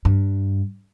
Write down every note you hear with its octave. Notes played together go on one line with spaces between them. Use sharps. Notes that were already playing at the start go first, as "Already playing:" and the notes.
G2